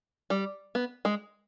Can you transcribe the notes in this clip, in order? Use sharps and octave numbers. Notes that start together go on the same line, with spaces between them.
G3
B3
G#3